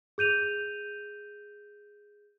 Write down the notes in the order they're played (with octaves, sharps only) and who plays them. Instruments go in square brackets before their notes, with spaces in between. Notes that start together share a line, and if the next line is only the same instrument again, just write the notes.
[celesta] G#4 G6 D#7 F7